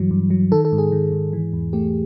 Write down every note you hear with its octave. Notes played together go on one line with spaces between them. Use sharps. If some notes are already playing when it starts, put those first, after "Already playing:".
Already playing: G2 E3 F#3
G2
F#3
D#3 A4
A4
G#2
G#4
D#3
G#2
E3
E2
A3 G4